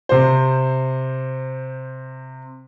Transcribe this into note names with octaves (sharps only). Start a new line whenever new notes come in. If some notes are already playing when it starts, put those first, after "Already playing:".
C3 C5